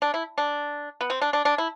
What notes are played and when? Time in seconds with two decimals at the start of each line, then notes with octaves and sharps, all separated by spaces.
0.02 D4
0.14 E4
0.38 D4
1.01 B3
1.10 C4
1.21 D4
1.33 D4
1.45 D4
1.58 E4